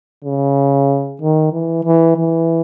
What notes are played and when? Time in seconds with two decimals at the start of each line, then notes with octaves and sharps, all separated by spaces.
0.25 C#3
1.21 D#3
1.52 E3
1.85 E3
2.17 E3